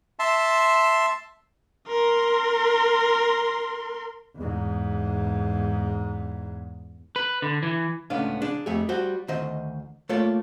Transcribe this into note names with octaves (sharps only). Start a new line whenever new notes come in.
E5 A5 C6
A#4 C6
E2 G#2
B4
D3
E3
C#2 A2 B3 C#4 D4 F5
D4 G#4
F2 A3 G4 G#4
G3 F#4 C5
D2 D#3 C5 D#5
A3 A#3 F4 C#5 D5